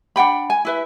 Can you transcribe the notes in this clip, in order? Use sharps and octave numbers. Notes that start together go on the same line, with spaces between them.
D4 F#5 G5 B5
G#5
E4 B4 E5